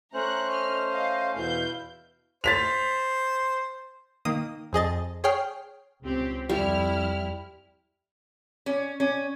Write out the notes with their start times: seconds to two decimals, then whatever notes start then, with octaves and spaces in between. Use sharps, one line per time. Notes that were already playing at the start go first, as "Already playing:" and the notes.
0.14 A3 C#4 C5 A#5 C#6 F#6
0.50 D#5 F6
0.90 D#5 F5
1.35 E2 B2 E4 B4 F5 G6
2.44 C5 A6 B6 F7
4.25 D#3 A#3 D#6
4.73 F2 G#4 D#5 A6
5.24 G#4 C#5 G5 F6 C7
6.04 C#2 C4 G4
6.49 F2 G3 E4 F6
8.66 C#4
9.00 C#4